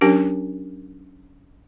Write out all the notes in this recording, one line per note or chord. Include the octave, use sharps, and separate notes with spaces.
F#3 C#4 D4 G4 A#4